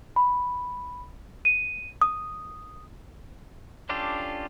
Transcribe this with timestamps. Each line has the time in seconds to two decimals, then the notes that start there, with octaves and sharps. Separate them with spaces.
0.16 B5
1.45 D#7
2.02 D#6
3.89 C#4 D4 F4 G4 A4